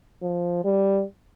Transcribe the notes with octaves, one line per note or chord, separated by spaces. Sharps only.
F3
G3